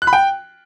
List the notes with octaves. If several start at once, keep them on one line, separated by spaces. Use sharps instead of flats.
F#6
B5
G5